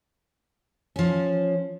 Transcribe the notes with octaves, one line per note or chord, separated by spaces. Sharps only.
F3 C#4